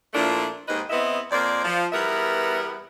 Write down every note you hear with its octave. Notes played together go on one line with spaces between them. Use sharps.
A#2 F3 A3 D4 E4 A#4
D#2 G#2 D#3 B4 C5 D#5
E2 B3 C4 E4 D#5 E5
F2 A#3 C5 D5
F3
E2 G3 B3 A#4 B4 E5